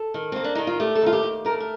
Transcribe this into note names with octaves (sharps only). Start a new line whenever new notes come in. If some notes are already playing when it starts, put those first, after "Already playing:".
Already playing: A4
D#3
A#3 C4
D4
D#3 D#4
F4
A3 G4
A4
D#2 F4
G4
D#2
A3 A#4
A#4